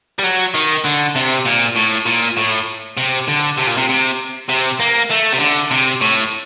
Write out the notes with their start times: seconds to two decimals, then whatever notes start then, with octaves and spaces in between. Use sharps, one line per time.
0.19 G3
0.23 F#3
0.54 D#3
0.84 D3
1.15 C3
1.45 A#2
1.75 A2
2.06 A#2
2.37 A2
2.97 C3
3.28 D3
3.58 C3
3.67 A#2
3.77 C3
3.89 C3
4.49 C3
4.80 A#3
5.11 A3
5.33 C3
5.40 D3
5.71 C3
6.01 A2